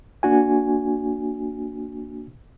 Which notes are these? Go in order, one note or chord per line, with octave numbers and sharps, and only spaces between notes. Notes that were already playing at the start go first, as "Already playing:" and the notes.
A#3 D4 F#4 G#5